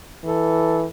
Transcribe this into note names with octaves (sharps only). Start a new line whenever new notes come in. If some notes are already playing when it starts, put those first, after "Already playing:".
E3 A4